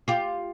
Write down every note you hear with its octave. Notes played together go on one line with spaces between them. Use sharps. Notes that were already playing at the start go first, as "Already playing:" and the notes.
F4 G4